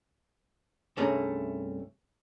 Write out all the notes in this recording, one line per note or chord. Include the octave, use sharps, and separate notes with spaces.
C2 G2 A3 C#4 G#4 A#5